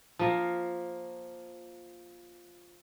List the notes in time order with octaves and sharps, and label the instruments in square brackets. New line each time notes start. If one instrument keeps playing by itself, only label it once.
[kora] F3 A#3